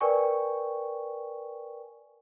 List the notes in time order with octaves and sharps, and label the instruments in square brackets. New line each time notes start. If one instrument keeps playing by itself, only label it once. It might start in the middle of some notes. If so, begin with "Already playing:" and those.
[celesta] A#4 B4 D5 G5 G#5 C#6